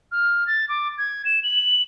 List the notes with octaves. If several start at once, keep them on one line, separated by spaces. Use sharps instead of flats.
F6
A6
D6
G#6
E7
F#7